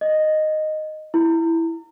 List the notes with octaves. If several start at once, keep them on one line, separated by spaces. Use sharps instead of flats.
D#5
E4